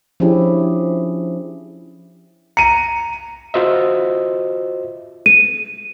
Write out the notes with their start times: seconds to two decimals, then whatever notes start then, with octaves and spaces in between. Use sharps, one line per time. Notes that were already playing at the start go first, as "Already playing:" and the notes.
0.20 F3 C#4 D4 E4 G4 G#4
2.57 A#5 C#7 D#7
3.54 F4 F#4 C5 D#5 E5
5.26 D#7